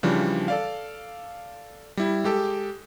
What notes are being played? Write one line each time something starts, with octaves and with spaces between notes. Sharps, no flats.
C#3 E3 F3 G3 D4
A4 D5 F5
G3 E4
G#3 G4 A4